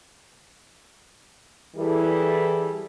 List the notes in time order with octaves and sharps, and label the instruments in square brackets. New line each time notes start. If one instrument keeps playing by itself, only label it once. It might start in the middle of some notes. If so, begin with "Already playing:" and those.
[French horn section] E3 G3 E4 G#4 A4